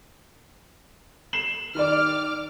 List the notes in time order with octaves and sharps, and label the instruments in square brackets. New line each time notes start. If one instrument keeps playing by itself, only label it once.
[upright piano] C7 E7 F#7
[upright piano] D#3 D5 [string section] D6 F6